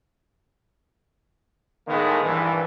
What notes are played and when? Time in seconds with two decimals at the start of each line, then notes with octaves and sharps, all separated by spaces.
1.88 A2 D#3 G#3 A#3 B3
2.24 A#1 G2 E3